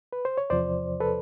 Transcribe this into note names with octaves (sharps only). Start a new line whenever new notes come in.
B4
C5
C#5
E2 C3 F3 C5 D5
A4 B4